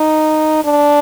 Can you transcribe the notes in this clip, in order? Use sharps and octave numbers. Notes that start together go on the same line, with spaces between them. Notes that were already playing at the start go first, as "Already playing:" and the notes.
Already playing: D#4
D4